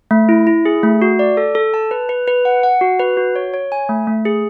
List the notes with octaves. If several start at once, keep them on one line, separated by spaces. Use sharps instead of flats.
A3
E4
E4
G#4
A3
F#4
D5
A4
A4
A5
B4
B4
B4
F#5
F#5
F#4
B4
F#4
C#5
C#5
G#5
A3
A3
G#4